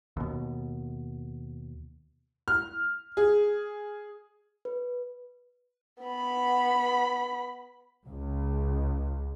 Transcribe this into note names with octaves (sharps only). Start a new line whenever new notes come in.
D#2 B2
F6
G#4
B4
B3 B5
C#2